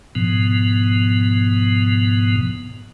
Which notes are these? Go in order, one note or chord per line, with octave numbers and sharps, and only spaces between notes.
G#2 B2 F3 B3